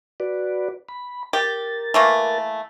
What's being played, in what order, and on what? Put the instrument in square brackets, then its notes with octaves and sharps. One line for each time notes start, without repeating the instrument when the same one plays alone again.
[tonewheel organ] F#4 B4 D5
B5
[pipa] G4 [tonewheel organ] A#4 A6
[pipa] E3 A3 A#3